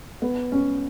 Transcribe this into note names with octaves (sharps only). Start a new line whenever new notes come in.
B3
C#4